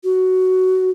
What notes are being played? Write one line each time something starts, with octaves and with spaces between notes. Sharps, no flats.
F#4